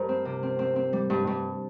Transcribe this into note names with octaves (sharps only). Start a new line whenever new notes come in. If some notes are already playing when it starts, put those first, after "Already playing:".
Already playing: G2 A#4 C5
C4
C3
C4
C4
C4
G3
G2
G2